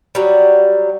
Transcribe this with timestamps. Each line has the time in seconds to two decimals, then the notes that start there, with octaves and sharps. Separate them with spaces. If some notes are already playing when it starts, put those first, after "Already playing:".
0.15 F#3 G3